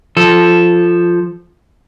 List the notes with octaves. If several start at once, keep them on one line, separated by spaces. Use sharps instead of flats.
F3 A4